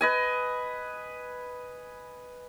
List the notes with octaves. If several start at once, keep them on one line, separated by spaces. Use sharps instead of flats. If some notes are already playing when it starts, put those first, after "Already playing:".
B4 D#5 G#5